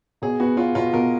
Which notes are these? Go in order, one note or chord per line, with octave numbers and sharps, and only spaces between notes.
B2 G#4
B3 F#4
B3 F4
B2 F4
B2 A#4